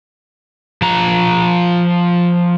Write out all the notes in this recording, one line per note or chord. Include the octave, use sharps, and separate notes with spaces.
F3 A#5